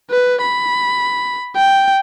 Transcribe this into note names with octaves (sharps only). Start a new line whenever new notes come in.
B4
B5
G5